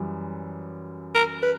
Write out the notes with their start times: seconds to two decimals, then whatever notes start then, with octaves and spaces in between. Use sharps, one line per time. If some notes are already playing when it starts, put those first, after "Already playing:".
Already playing: F#2 E3 G3
1.15 A#4
1.43 B4